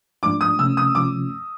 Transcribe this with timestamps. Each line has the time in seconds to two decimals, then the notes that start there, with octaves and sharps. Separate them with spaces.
0.23 G#2 F3 A3 D4 D6
0.41 D#6
0.59 C3 F3 A3 C#4 E6
0.77 D#6
0.95 C3 F3 A3 C#4 D6